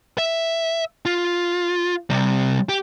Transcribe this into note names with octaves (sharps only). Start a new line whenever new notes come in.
E5
F4
C3 G3
G4